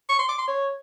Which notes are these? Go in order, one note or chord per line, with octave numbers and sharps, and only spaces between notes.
C#6
C6
D6
C6
C#5